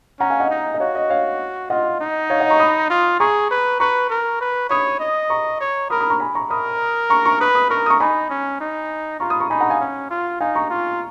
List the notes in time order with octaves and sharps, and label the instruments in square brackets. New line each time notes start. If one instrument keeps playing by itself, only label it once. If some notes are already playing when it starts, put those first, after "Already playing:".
[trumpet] C#4 [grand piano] F#5 A#5
[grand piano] F5 G#5
D#5 F#5
[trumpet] D#4
[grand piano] D#5
[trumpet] F#4 [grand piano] C#5 F5
[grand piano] D#5
C#5 F5
[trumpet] F4 [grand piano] D#5 F#5
[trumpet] D#4
[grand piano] C#5 F5
D#5 F#5
A#5 C#6
B5 D#6
[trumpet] F4
[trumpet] G#4 [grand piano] A#5 C#6
[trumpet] B4
[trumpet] B4 [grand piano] A#5 C#6
[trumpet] A#4
B4
[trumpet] C#5 [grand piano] B5 D#6
[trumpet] D#5
[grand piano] A#5 C#6
[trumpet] C#5
[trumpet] A#4 [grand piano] B5 D#6
[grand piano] B5 D#6
A#5 C#6
G#5 B5
A#5 C#6
[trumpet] A#4 [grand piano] B5 D#6
[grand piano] A#5 C#6
A#5 C#6
[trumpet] B4 [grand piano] B5 D#6
[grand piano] B5 D#6
[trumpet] A#4 [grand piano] A#5 C#6
[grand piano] D#6
A#5 C#6
[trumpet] D#4 [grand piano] G#5 B5
[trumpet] C#4
D#4
[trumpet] F4 [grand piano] A#5 C#6
[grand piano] B5 D#6
A#5 C#6
[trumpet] D#4 [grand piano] G#5 B5
[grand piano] F#5 A#5
F5 G#5
[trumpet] C#4
F4
[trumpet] D#4 [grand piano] F5 G#5
[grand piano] A#5 C#6
[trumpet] F4